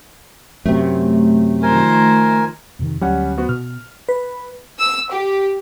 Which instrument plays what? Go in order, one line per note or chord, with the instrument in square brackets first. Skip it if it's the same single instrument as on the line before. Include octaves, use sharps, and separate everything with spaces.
[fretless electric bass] F#2 C3 [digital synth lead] A3
[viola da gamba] D#3 F3 C5 [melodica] A#4 G#5
[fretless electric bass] F2 C3 D#3
[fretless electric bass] D2 F#3 [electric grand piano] G3 C#4 F#5
[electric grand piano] B3 F#4 C5
[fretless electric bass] B2 [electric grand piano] F6
[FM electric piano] B4
[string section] E6
G4